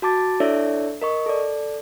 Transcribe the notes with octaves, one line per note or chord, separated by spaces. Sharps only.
F#4 A5 D6 A6
D4 E4 A4 C#5 D5 E5
A#4 D#5 C#6
A4 D5